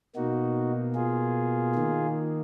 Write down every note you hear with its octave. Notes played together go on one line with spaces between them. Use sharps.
B2 A#3 D#4 F#4
F4 G#4
D#3 A#3